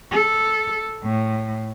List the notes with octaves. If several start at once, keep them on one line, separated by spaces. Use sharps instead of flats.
A4
A2